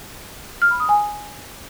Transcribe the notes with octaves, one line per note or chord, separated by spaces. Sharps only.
F6
B5
D#6
G#5